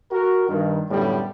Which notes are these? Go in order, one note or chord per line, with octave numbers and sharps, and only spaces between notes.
F#4 A#4
G2 D#3
F#2 A2 D3 G3 B3 D4